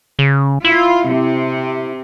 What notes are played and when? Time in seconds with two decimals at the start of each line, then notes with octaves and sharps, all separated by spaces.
0.19 C#3
0.64 E4 F4
1.07 C3